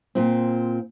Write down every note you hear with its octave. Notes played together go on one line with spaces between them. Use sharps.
A#2 C4